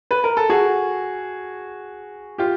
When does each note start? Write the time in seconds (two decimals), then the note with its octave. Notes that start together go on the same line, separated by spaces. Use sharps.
0.11 B4
0.24 A#4
0.37 A4
0.50 F#4 G#4
2.38 F4 G4